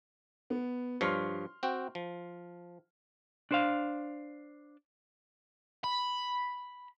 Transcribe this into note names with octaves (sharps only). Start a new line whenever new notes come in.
B3
G2 F3 C#5 C6 F6
C4 F#4 G5
F3
D4 C5 F5
B5